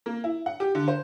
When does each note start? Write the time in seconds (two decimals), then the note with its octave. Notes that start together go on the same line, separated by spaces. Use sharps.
0.06 A#3
0.24 E4
0.46 F#5
0.60 G4
0.75 D3
0.88 C5